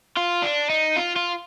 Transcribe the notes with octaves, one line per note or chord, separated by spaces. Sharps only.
F4
D4
D#4
F4
F4